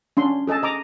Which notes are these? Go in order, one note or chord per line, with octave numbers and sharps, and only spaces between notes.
C#4 D4 C6
G#4 A4 D#5 A5
D#5 A#5 D6